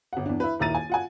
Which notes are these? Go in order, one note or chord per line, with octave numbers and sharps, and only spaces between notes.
G1 F#5
E2 D4
E4 B4
D#1 D#3 E4 A#5 A6 D#7
G#5
F4 F#5 G#5